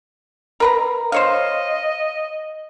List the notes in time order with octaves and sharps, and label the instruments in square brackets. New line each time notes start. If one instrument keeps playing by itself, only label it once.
[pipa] A#4 B4 A#5
[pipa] C5 C#5 F5 [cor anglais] D#5